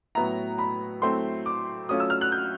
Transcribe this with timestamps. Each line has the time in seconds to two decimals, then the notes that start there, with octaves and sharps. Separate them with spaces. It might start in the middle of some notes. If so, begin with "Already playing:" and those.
0.15 A2 F#3 B3 E4 A#5
0.58 B5
1.02 F#3 A3 C4 E4 C6
1.46 D6
1.89 F#3 A3 C#4 F4 D#6
2.00 E6
2.10 F6
2.21 F#6
2.32 G6